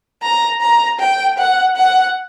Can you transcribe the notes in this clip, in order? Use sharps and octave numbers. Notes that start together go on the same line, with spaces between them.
A#5
A#5
G5
F#5
F#5